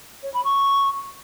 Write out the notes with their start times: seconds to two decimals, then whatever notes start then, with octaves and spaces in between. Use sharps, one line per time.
0.23 C#5
0.34 B5
0.45 C#6